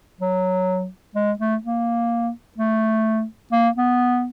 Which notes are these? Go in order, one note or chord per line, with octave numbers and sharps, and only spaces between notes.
F#3
G#3
A3
A#3
A3
A#3
B3